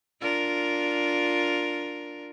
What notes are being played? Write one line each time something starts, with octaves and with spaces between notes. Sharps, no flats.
D4 F4 A#4